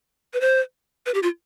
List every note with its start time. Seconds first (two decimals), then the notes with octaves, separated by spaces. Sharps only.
0.34 B4
0.41 C5
1.06 B4
1.14 G4
1.23 F4